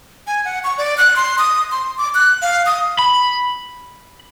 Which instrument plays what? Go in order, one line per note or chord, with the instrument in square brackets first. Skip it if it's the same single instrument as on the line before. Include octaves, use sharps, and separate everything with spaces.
[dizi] G#5
F#5
C#6
D5
F#6
C6
D#6
C6
D6
F#6
F5
D#6
[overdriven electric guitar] B5